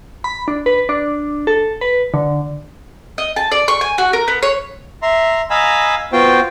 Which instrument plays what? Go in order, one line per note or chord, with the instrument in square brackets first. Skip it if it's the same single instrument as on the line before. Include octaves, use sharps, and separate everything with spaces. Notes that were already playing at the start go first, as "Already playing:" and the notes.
[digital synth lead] B5
D4
B4
D4
A4
B4
D3
[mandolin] D#5
A5
D5
C#6
G#5
F#4
A#4
B3
C#5
[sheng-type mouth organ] E5 A#5 C6
D#5 F5 G#5 A#5 B5 E6
B3 F4 F#4 C5 G5